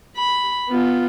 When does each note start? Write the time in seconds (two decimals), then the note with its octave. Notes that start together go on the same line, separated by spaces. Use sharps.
0.16 B5
0.69 B3 F4